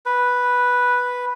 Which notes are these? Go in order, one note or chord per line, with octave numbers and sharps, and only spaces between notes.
B4